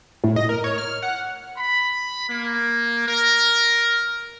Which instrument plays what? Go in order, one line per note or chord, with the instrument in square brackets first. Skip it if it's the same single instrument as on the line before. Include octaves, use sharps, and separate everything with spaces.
[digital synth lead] A2
D#5
A#4
C#5
F6
F#5
[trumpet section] B5
A#3
A#4